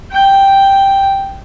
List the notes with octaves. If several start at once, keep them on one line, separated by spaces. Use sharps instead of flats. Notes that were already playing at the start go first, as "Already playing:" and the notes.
G5